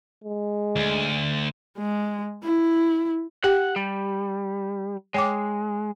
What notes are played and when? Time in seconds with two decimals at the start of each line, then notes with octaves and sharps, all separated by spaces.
0.24 G#3
0.76 D2
1.79 G#3
2.44 E4
3.44 G4 F#5 G5
3.76 G3
5.14 G#3 C#5 G5 D6